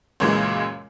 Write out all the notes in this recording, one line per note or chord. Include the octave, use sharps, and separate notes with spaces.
C#2 F#2 A#2 C#3 E3 G#3